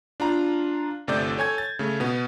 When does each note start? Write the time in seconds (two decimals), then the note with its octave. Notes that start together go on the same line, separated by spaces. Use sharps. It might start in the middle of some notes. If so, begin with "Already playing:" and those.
0.20 D4 F4 A#5
1.08 G1 C3 A3 D5 G6
1.37 A4 C#5 G#5 G#6
1.58 A6
1.79 C#3 A3
2.00 B2 B3